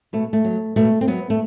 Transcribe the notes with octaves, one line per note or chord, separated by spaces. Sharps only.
B2 A3
A3
F#3
B2 A3
C4
F#3 B3
A3